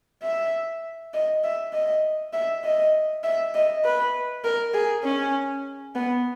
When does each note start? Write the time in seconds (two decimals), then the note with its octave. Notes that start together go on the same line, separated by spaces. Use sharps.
0.23 E5
1.14 D#5
1.44 E5
1.73 D#5
2.33 E5
2.64 D#5
3.24 E5
3.54 D#5
3.85 B4
4.44 A#4
4.74 G#4
5.04 C#4
5.95 B3